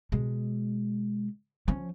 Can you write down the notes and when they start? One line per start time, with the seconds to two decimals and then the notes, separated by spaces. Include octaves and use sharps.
0.12 B2 G#3
1.68 F3 C#4